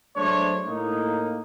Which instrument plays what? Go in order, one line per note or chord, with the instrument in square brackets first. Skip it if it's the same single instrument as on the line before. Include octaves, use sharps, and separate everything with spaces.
[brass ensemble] F#3 G#3 A3 D4 C5 C#5
A2 A#3 D#4